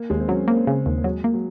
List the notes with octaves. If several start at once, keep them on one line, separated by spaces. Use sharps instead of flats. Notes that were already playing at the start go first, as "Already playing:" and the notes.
Already playing: A#3
D#2 G#3
C4
F#3 C#4
A#3 C4
C#3
D#2
A#3
F#3 G#3
A#3
F#3